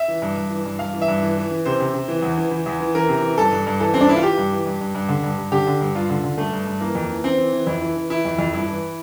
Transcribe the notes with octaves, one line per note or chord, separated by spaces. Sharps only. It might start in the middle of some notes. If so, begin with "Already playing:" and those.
Already playing: E5
E3
G2
G2
E3
G2
G2 F5
E3
E5
G2
E3
E3
E3
C3 C5
C3
C3
E3
E2
E3
E3
E2
E3
E3 A#4
C3
E3
G2 A4
G2
G2
E3 A4
G2 C4
D4
E3 E4
F4
E3 G4
G2
E3
G2
G2
G2
D3
G2
G2
D3 G4
D3
G2
G2 F4
D3
D3
G2 A3
G2
G2
E3 A#3
F2
E3
E3 C4
E3
E3
F2 E4
E3
E3
E3 E4
F2
F2
G2 E4
E3